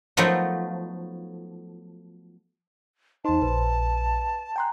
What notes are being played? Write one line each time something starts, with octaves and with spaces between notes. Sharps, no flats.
F3 F#3 A3 B3 D#4
E2 D#4 C5 A5 C6
A#1 B4
G5 G#5 A#5 C6 F#6